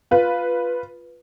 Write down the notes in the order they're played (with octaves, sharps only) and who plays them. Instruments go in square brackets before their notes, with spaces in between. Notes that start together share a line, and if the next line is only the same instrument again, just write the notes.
[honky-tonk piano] F4 B4